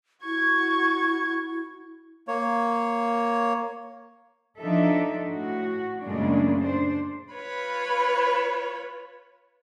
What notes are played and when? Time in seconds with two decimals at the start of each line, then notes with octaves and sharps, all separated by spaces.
0.24 E4 F#4 C#6 G#6
2.28 A#3 C#5
4.57 F3 D4 D#4 A4 E5
5.26 A2 F#4
6.02 F#2 A#2 C#3 G#3 A3 D4
6.62 D4 C5
7.33 F4 B4 C#5 B5